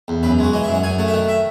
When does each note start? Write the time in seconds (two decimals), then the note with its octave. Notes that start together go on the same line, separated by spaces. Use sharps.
0.08 E2
0.23 F#2 B4
0.38 G#3 F#4
0.53 E3 D#5
0.63 E5
0.68 F#2
0.73 F#5
0.83 F#2 G#5
0.98 A3 F#5
1.08 E5
1.13 D#3 F#5
1.28 E5